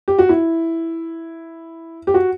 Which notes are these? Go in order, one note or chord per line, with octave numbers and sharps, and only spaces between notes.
G4
F#4
E4
G4
F#4